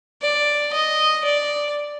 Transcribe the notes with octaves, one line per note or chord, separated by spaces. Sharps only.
D5
D#5
D5